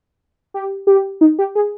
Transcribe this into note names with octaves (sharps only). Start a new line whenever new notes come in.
G4
G4
D#4
G4
G#4